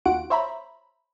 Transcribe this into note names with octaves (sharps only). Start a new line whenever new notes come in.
D#2 F4 F#4 F#5 D7
C5 C#5 E5 A#5 B5